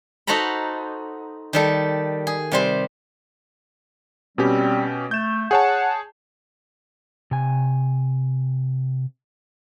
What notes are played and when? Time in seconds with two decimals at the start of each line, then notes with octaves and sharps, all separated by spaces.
0.27 D#4 F#4 A4 C5 A#5 B5
1.53 D#3 G3 A4
2.27 G#4
2.52 C3 G3 C5
4.38 B2 G3 C4 C#4 G4
5.11 A3 G6 E7
5.51 G#4 C#5 F#5 A5
7.31 C3 G#5